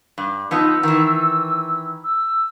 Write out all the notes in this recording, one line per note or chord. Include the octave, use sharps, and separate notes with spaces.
G2
F3 B3 D#4 E6
D#3 E3
E6